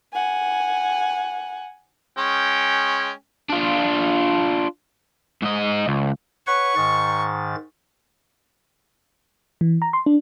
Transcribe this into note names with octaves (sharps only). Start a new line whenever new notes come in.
F#5 G#5
G#3 C#4 G5
D4 F4
G#2 D#5
C#2
B4 C#5 F#5 C#6
G#2 D#3 A6
E3
A#5
C6
D4